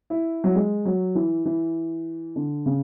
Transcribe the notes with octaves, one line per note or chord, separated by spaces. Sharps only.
E4
F#3
G#3
F#3
E3
E3
D3
C#3